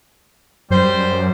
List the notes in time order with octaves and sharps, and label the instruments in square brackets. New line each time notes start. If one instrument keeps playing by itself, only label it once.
[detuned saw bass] F#2 [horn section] G3 C5